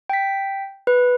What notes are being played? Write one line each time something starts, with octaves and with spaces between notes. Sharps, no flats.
G5 B6
B4